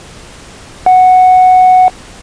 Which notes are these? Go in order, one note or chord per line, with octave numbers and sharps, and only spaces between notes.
F#5